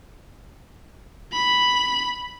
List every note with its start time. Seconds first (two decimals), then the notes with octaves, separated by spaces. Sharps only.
1.33 B5